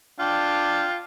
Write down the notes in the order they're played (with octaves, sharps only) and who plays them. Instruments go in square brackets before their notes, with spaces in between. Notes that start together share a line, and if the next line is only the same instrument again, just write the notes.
[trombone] D4 [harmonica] F4 G5